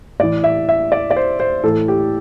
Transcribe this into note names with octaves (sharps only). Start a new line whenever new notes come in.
A2 E3 D5
E5
E5
D5
D5
C5
C5
A2 E3 A4
G4